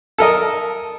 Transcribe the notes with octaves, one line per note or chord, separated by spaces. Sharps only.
A4 A#4 D#5